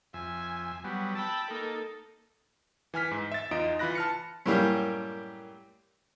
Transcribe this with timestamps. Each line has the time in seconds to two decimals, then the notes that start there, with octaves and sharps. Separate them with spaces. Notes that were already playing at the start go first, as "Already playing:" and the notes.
0.14 F2 E5 G#5
0.84 F#3 G3 B3
1.15 G5 A5 B5 E6
1.50 A#3 D#4 A4 A#4
2.94 E3 G#5 F6 B6
3.11 G#2
3.32 E5 A6
3.51 E2 D#4 F4 D#5 D#6 D7
3.79 E3 F4 B5 F#6 A#6
3.95 A5 F6 C#7
4.46 F#2 A2 G3 A#3 G4